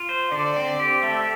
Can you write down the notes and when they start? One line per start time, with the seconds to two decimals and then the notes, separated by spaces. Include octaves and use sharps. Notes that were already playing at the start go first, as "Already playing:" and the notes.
Already playing: F4
0.09 C5
0.32 D3 D5
0.56 C4
0.80 G4
1.03 A3 E5